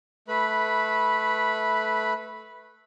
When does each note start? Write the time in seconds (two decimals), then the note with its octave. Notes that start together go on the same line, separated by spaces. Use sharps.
0.28 A3 B4 B5